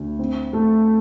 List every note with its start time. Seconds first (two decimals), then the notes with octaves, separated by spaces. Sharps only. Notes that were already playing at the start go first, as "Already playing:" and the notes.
Already playing: D2
0.19 C4
0.53 A3